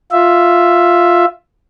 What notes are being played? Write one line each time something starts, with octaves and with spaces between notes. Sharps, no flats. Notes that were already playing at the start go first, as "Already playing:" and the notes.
F4 E5